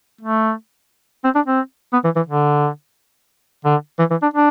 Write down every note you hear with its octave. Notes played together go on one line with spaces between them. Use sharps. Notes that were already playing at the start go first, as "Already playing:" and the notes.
A3
C4
D4
C4
B3
E3
E3
D3
D3
E3
E3
D4
D4